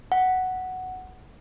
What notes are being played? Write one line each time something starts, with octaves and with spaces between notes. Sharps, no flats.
F#5